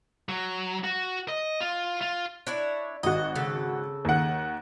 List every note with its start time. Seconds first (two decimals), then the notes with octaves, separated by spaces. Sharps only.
0.29 F#3
0.84 F#4
1.28 D#5
1.61 F4
2.01 F4
2.47 D4 E4 C#5
3.03 G#1 F#4 D#5
3.35 C#3 A4
4.05 D#2 F#5